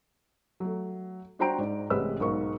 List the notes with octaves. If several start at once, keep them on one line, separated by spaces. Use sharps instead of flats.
F#3 A3
D4 F#4 C5 G5 A#5 D7
G#2 D5
A1 C3 G#3 B4 D#5 E6
B1 G#2 A#4 C#6